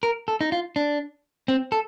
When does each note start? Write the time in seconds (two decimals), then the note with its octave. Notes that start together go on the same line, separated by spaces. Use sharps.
0.03 A#4
0.28 A4
0.41 D#4
0.52 F4
0.76 D4
1.48 C4
1.72 A4